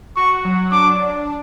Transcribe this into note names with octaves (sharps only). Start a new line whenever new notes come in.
F#4 C#6
F#3
D4 D6